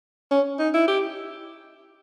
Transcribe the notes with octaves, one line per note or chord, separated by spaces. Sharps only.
C#4
D#4
E4
G4